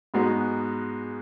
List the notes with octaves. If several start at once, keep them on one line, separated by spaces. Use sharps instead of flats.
G#2 G#3 B3 D#4 F#4